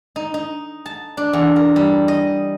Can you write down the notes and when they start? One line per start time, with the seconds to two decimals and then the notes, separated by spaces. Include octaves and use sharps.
0.16 D#4
0.34 D#4
0.86 A5
1.17 D4
1.33 E2
1.56 A#4
1.76 G3
2.08 D#5